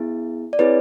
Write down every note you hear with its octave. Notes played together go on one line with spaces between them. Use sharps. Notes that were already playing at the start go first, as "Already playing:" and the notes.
Already playing: B3 E4 G#4
D5
C4 E4 G#4 B4 C#5